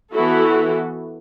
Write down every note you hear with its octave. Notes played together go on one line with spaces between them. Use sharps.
E3 B3 E4 F#4 A4